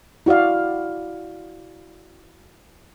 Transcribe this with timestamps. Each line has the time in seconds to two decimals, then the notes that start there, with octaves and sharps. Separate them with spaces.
0.26 E4 F#4 D5 F5